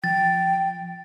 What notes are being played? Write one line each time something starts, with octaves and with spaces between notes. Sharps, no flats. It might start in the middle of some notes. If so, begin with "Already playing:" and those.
F3 G5 A6